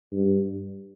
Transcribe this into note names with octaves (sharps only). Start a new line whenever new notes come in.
G2